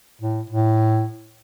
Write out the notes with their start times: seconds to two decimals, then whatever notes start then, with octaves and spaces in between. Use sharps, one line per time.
0.21 A2
0.50 A2